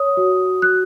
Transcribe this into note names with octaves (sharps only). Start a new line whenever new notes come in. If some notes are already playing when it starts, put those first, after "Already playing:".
Already playing: C#5 D#6
F#4
F#4 F#6